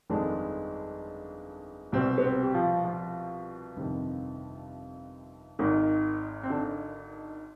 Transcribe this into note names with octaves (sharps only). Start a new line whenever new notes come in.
G1 F2 D3 D#3 G#3 D4
C2 B2 G3 C4
B3
C4
G4
F3 F4
F3 F4
G1 F2 C3 D#3
G#1 G#2 D#3
C4
D3 D4